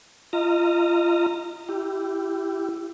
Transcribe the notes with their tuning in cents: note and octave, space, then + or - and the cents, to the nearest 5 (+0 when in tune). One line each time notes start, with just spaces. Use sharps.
F4 -25 D#5 +0 A#5 -25
E4 +20 G4 -10